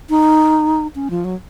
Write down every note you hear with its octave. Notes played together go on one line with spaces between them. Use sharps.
D#4
C#4
F3
F#3